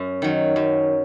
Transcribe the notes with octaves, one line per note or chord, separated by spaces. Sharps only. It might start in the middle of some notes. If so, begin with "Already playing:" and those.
Already playing: F#2
D#3 F#3
F#2